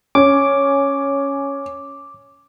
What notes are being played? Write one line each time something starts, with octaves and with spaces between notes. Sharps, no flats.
C#4 D6